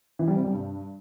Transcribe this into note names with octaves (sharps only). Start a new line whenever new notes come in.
E3
G3
C3
G3
G2